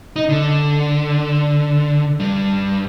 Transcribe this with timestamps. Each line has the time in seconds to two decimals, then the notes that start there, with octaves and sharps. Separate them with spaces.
0.16 D#4
0.29 D3
2.20 G2